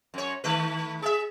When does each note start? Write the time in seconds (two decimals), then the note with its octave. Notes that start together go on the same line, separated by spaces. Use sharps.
0.14 F#2 C#5
0.44 D#3 A3 B4
1.02 G#4 E5